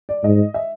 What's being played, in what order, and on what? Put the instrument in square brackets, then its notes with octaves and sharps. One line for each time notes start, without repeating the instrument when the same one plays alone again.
[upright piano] D5
[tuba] G#2 [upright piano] D#5
[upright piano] E5